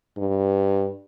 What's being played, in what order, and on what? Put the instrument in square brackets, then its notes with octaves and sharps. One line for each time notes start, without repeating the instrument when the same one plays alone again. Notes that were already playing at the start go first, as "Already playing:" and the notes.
[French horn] G2